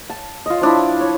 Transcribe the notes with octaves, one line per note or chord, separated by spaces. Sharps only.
A5
F4 D#5
F3 D4 E4
C#5